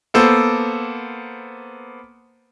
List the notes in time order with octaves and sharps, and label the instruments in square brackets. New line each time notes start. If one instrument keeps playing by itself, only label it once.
[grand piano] A#3 B3 A4 C5